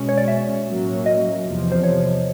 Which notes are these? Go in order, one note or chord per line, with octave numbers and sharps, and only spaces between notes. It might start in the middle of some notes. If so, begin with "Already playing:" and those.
Already playing: B2 G#3 C#4
C#5
D5
E5
A2 F#3 A#3 C#4
D#5
E2 C3 F3
C5
C#5